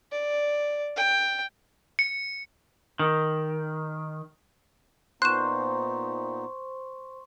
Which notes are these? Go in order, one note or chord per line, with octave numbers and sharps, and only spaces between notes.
D5
G5
C#7
D#3
A#2 B3 D#4 C5 C6 C#6 F#6 E7